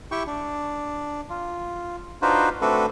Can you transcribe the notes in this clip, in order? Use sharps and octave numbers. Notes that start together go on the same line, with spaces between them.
E4 G4 G5 C#6
D4
F4
D4 D#4 F4 F#4 B4 C5
A3 C4 D4 F#4 A4 B4